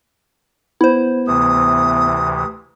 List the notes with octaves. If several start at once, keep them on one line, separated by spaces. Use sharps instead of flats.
B3 E4 C5
D2 C3 E3 D#6